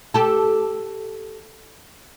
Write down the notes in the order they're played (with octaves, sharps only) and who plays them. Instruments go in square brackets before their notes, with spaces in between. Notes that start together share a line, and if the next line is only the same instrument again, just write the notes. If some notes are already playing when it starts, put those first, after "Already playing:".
[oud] G4 A4